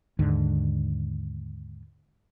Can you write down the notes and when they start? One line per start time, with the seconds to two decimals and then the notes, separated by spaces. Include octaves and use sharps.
0.19 D#2 G#2 D3